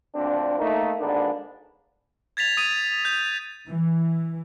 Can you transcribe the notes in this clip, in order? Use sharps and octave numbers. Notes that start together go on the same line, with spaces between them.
D2 A#2 C4 D4
A3 A#3 D#4
G#1 G#2 D3 A#3 B3 D4
G#6 A6 B6 F7
D#6 D#7 F7
G6
E3